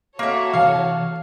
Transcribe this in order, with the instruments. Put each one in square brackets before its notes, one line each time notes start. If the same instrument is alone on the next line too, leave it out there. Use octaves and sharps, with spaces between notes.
[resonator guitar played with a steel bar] A#3 E5 [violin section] F#4 A4 C#5
[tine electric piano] C3 E3 [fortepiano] F5